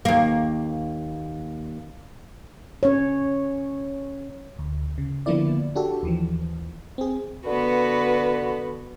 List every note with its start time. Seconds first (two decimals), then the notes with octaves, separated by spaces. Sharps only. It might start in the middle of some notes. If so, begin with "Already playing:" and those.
0.05 D#2 A#3
2.83 C#4 C#5
4.59 D2
4.98 C#3
5.26 D3 F3 A#3 B3 E4 D5
5.76 D4 F#4 G4 A4
6.03 D#2 E3 F3
6.98 C4 G#4
7.46 D3 B3 F#4 B4